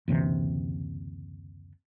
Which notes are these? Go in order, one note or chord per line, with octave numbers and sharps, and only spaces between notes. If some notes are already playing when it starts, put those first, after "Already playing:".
F#1 D2 C3 E3